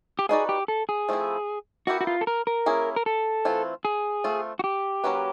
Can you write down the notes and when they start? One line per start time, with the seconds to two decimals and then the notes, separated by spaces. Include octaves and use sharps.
0.19 G4
0.29 B3 D#4 F#4 G#4 B4 D5
0.49 G4
0.68 A4
0.89 G#4
1.09 F3 A3 C4 E4
1.87 B3 E4 F#4 G4 A#4
2.01 F#4
2.07 F4
2.21 A4
2.27 A#4
2.47 A#4
2.66 A#3 C#4 E4 G#4
2.96 A#4
3.06 A4
3.45 E3 A3 C4 F4
3.85 G#4
4.24 A3 C4 F4
4.59 F#4
4.64 G4
5.04 F#3 A#3 C#4 F#4 B4